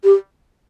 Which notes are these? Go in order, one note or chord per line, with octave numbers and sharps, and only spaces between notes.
G4